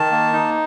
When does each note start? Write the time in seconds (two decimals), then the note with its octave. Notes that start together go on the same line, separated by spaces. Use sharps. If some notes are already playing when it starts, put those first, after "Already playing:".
Already playing: D#3 A5
0.12 A#3
0.33 D#4